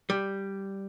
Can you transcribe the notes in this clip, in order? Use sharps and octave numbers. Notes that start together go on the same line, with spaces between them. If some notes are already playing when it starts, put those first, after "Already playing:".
G3